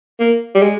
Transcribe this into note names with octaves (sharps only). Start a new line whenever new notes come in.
A#3
G3
G#3